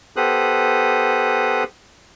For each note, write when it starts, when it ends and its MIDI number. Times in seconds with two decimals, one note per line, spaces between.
0.17 1.64 59
0.17 1.64 67
0.17 1.64 69
0.17 1.64 72
0.17 1.64 87
0.17 1.64 90